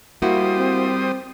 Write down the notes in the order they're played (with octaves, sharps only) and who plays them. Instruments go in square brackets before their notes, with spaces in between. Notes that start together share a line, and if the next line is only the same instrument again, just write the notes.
[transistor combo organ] G3 C5 D#6 [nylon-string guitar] A#3 E4 F#4
[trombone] C4